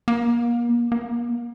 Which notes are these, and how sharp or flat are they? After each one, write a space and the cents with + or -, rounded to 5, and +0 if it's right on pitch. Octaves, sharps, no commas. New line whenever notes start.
A#3 +35
A#3 +40